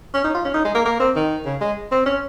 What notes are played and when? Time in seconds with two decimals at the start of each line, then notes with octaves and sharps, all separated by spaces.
0.14 C#4
0.24 D#4
0.34 F4
0.45 C#4
0.54 D#4
0.65 G#3
0.75 A#3
0.86 A#3
1.00 C4
1.16 D#3
1.45 C#3
1.61 G#3
1.92 C4
2.06 C#4